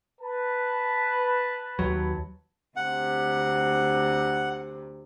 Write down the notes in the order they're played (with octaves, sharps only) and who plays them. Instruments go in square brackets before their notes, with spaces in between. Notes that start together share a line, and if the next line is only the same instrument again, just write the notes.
[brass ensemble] B4 A5
[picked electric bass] D#2 F#3
[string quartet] D2 C3 [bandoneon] F#5